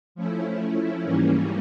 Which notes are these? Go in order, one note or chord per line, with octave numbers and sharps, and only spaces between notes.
F3 A3 C#4 E4
G#2 E3 G3 A#3 C#4